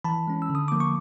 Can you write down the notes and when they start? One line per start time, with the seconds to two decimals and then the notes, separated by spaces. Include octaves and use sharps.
0.04 E3 A5 B5
0.27 G#3 C#4
0.42 E6
0.50 D3
0.55 D#6
0.68 F3 A#3 D6
0.80 C#6